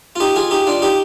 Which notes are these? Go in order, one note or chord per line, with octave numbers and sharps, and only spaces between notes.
F4
D#4 G4
F4 G#4
D#4 G4
D4 F4
D#4 G4